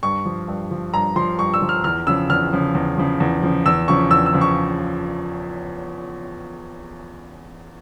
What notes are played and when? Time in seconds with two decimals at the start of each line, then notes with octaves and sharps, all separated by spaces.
0.03 G2 C#6
0.25 F3
0.48 G2
0.71 F3
0.94 G2 A#5
1.16 F3 C6
1.39 G2 C#6
1.54 E6
1.62 F3
1.69 F6
1.84 E2 F6
2.07 C#3 F3 E6
2.30 E2 F6
2.53 C#3 F3
2.75 E2
2.98 C#3 F3
3.20 E2
3.43 C#3 F3
3.66 E2 E6
3.88 C#3 F3 C#6
4.11 E2 E6
4.26 E6
4.33 C#3 F3
4.41 C#6